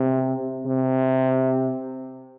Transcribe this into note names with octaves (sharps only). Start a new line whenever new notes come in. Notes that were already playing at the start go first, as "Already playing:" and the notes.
Already playing: C3
C3